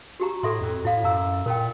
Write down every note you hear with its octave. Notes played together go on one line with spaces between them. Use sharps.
F#4 G4 A#5
A2 A4 E5 C6
F2
A2 E4 F5
F#2 F5 A#5 E6
A#2 A#4 G5